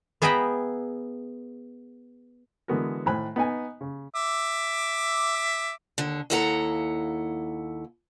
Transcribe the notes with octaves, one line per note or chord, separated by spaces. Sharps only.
B3 G#4 E5 G5 A#5 B5
D3 E3 G#3 B3 F#4 A#4
A2 D#3 C5 G#5 B5 F#6
B3 D#4 G#5
C#3
E5 D6
D#2 D3
D#2 A#3 E4 A4 F#5 A#5